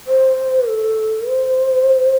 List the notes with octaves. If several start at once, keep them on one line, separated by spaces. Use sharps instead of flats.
C5
A4
C5